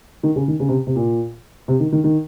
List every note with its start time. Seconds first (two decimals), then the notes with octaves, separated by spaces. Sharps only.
0.23 D#3
0.36 C#3
0.48 D#3
0.60 C#3
0.69 C3
0.87 C3
0.96 A#2
1.68 C3
1.80 D#3
1.92 D#3
2.04 D#3